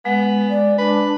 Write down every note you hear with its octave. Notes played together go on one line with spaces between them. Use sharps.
G#3 B3
D5
D4 B4